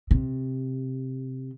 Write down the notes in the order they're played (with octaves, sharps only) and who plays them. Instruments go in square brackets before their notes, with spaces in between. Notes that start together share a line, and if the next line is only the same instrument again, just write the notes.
[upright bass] C3